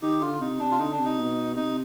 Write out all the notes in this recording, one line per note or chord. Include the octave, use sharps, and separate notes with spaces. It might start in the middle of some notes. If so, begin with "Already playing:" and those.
D#3 D#4 G4
D3 F4
C3 D#4
C3 D4
F4
D3 D#4
D4
C3
D#4
B2
C3 D#4